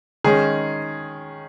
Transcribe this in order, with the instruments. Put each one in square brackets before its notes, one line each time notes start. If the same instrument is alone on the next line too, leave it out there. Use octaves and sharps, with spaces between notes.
[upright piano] D#3 G#3 C#4 G#4